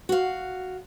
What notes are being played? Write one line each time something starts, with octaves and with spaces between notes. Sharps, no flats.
F#4 F5